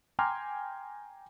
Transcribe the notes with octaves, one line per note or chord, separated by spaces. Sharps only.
G5 G#5 A#5 C6 D6 F6